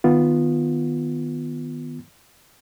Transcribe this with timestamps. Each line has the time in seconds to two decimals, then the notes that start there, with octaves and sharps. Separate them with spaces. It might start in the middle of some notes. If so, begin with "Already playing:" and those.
0.04 D#3 B3 F4